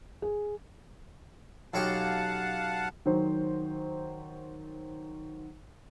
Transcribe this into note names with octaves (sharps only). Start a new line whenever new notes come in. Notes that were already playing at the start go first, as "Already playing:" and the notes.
G#4
B1 C#4 G4 F5 F#5 A5
D#3 F#3 C5